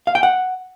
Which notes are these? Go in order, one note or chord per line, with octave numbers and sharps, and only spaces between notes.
F5
G5
F#5